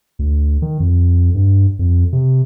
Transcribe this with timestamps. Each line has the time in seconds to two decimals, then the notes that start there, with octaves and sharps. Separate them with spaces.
0.19 D2
0.62 D#3
0.80 F2
1.34 G2
1.79 F2
2.13 C3